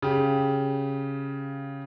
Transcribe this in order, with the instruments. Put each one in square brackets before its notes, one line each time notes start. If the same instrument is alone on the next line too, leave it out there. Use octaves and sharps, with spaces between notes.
[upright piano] C#3 G4